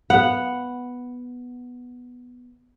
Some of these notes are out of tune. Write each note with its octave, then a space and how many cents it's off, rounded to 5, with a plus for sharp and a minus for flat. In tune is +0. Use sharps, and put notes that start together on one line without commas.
B3 +0 F#5 +0